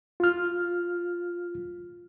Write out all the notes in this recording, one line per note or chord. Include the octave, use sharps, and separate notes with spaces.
F4 F6